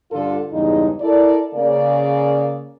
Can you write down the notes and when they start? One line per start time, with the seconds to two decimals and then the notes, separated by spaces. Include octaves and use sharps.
0.12 G2 D3 D4 F4 A4
0.52 E2 G2 C#3 G#3 D#4
1.01 E4 A4 A#4 D5
1.54 C#3 A#3 D5